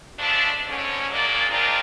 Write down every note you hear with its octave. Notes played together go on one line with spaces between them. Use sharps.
F3 G#3 A3 D4
G#2 D3 C#4
A#2 F#3 G#3 A#3 D4 D5
D#3 G#3 C4 D4 F4 A#4